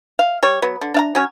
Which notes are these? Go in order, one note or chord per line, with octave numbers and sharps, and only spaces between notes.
F5
G3 C#5
F#3 B3
D3
D4 F5 A#5
F#3 C#4 C#5